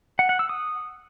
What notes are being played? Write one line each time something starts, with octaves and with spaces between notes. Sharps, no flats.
F#5
F#5
E6
D#6